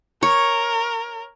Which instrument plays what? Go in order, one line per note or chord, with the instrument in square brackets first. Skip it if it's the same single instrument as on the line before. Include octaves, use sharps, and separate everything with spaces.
[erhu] A#4 [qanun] C#5